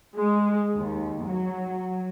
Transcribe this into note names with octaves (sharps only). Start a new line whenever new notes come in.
G#3
D#2
F#3